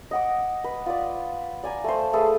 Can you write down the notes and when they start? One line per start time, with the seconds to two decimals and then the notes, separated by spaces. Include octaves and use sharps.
0.11 D#5 F#5 D6
0.64 B4
0.86 F4 D5
1.64 D5 G#5 A#5
1.84 A3 C5
2.13 A3 G#4 A4 B4